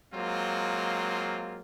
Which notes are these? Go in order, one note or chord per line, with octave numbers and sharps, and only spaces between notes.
F#3 G#3 A#3 C4 F4